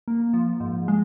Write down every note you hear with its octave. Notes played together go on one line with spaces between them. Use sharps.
A#3
F3
G#2
G#3